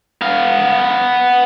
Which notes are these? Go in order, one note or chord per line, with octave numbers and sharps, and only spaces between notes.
B3 F5